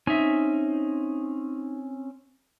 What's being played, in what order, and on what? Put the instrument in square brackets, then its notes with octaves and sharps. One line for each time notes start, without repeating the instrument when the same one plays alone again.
[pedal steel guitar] C4 C#4 G#5 [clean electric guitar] D#4 E5